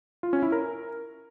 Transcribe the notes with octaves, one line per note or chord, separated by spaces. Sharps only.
F4
C#4
E4
A#4